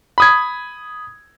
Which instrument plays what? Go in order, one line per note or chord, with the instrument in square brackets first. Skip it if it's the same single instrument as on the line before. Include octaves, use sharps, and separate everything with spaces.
[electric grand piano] B5 D#6 G#6